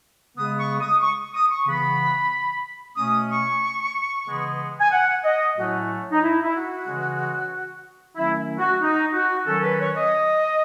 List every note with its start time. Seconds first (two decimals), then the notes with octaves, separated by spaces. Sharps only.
0.37 C#3 G#3 B3 D#6
0.58 C#6
0.80 D#6
1.01 C#6
1.34 D#6
1.50 C#6
1.66 C#3 E3 B3 B5
2.96 B2 A3 C#4 D#6
3.29 C#6
4.26 C#3 E3 G#3 B3
4.80 G#5
4.91 F#5
5.24 D#5
5.56 A2 F#3 A3 C#4 F#4
6.12 D#4
6.22 E4
6.42 E4
6.54 F#4
6.87 C#3 E3 G#3 C#4
8.16 D#3 F#3 A3 C#4 E4
8.59 F#4
8.81 D#4
9.13 F#4
9.46 D#3 F#3 C#4 A4
9.63 B4
9.79 C#5
9.95 D#5